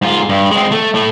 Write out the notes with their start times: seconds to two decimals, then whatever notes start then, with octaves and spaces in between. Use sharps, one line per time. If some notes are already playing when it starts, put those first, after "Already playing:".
0.02 G#2 F4
0.29 G2
0.51 G#3 C4
0.72 A3
0.94 A2 A3